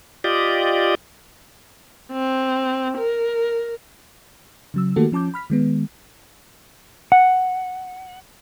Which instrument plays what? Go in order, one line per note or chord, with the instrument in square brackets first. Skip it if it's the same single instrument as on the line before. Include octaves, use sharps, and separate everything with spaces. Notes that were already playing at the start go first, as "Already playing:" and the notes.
[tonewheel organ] F4 G4 D5 D#5
[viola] C4
A#4
[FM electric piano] C#3 F#3 E6
D#3 A3 A#3 F#4 G4 A4
F3 C#4 A5 D6 G6
B5 F6 B6
D#3 G#3 B3
[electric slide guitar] F#5